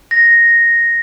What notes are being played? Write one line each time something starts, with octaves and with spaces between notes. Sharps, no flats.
A#6